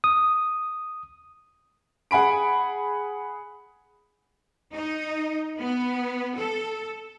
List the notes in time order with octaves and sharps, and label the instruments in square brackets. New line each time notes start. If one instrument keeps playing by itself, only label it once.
[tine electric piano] D#6
[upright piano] G#4 F#5 G#5 B5 D7
[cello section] D#4
B3
A4